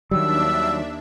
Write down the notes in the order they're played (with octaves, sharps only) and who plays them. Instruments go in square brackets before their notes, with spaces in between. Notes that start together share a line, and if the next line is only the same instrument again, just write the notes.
[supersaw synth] D#2 D4 E5 [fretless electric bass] D#3 F#3 G3 [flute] E6